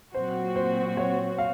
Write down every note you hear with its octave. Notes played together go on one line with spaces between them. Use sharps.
A#2 F#3 C4 F#4 C5
C5
C#5
F5